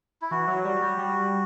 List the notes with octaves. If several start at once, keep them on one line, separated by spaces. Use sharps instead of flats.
E4
E3 F#4
F#3
G3
G3
G3